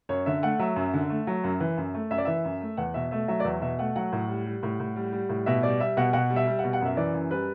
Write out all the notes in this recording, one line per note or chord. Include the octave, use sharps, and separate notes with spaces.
F#2 C#5
D3 E5
A3 F#5
F#3 E5
F#2
D3
A3
F#3
F#2
E3
F#2
A3
F#2 E5
D5
E3 E5
F#2
A3
E2 F#5
B2 E5
A3 E5
F#3 E5
D5
E2 E5
B2 E5
A3 F#5
F#3 F#5
A2
G3
G3
A2
A2
G3
G3
A2
B2 E5
G3 D5
G3 E5
B2 F#5
B2 F#5
G3
E5
G3
F#5
B2
F#5
F#2 E5
E3 D5
F#2
G3 B4